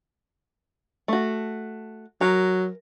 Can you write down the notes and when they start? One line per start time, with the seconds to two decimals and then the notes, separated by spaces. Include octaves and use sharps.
1.08 A3 F#4
2.21 F#3 A#4